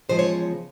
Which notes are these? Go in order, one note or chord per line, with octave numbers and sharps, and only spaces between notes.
E2 C#3 F3 G#3 C5
C#5